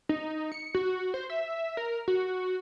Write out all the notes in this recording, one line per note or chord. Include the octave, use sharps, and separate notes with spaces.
D#4
C#7
F#4
C5
E5
A#4
F#4